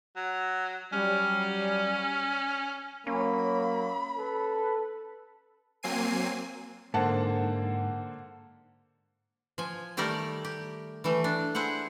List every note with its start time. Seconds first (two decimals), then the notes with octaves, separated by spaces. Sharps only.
0.16 F#3
0.93 F#3 G3 C#4
3.07 F#3 A#3 C#4 B5
4.17 A4 B4
5.83 F#3 A#3 C4 G#5 C7 D#7
6.94 G#2 D3 A#3 C5 F#5 A5
9.58 F3 G#5
9.97 D#3 G3 A3 G4 A#4 D5
10.45 G4
11.04 E3 G3 A3
11.24 D4
11.55 E4 G#4 C5 F#5